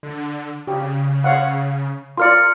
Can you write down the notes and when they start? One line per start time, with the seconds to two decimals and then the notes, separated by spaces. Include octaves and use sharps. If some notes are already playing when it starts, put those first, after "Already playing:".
0.03 D3
0.67 C#3 G4
1.24 C#5 F5 F#5
2.17 F4 A#4 D5 C6 F6 C#7